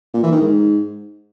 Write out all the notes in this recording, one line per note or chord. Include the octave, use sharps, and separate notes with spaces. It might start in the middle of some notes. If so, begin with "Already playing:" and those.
A#2
E3
D#3
G#2